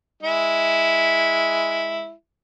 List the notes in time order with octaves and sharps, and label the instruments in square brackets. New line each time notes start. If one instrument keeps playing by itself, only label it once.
[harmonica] G#3 E4